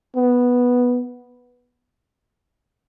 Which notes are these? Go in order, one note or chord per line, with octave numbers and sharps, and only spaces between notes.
B3